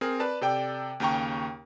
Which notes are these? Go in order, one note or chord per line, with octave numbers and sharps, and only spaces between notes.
C4 G#4 A#4
B4 D5 A5
C3 A4 D5 G5
D#2 C#3 G5 A#5 C#6